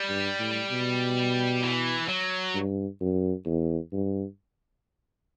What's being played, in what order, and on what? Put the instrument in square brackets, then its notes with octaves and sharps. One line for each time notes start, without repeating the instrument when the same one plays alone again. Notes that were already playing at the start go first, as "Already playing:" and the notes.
Already playing: [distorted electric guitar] G3
[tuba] G2
A2
B2
[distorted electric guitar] E3
F#3
[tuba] G2
F#2
E2
G2